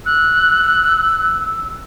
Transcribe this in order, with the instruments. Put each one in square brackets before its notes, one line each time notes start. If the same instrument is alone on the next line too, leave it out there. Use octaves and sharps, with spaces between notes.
[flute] E6 [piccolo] F#6